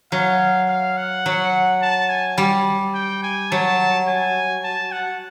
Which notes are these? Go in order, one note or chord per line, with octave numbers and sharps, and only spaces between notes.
F#3 F5
F5
F#5
F#3
A5
G#5
G3
G5
G#5
F#3 A5
G#5
A5
F#5